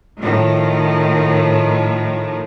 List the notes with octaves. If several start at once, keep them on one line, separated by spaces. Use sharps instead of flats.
A2 D#3 F3